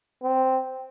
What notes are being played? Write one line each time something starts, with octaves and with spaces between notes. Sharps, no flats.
C4